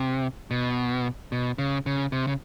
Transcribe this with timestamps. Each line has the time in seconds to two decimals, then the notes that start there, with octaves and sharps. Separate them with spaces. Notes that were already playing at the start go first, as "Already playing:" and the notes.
Already playing: C3
0.51 B2
1.32 B2
1.58 C#3
1.86 C#3
2.12 C3
2.27 C#3